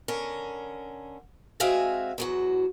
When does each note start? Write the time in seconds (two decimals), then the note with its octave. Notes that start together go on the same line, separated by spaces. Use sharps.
0.08 D3 C#4 A#4
1.60 G#3 C4 F#4 E5 F5 G#5
2.18 E2 F#3 F#4